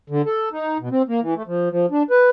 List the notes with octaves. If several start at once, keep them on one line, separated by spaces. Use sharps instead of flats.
D3
A4
D#4
B2
C4
A#3
E3
A3
F3
F3
D4
B4